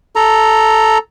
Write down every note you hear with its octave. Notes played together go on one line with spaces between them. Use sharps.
A4 A#5